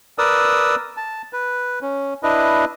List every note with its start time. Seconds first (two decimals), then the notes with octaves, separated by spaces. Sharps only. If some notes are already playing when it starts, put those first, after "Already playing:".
0.18 A#4 B4 D5 D#6 E6
0.97 A5
1.33 B4
1.82 C#4
2.23 D4 E4 B4 D#5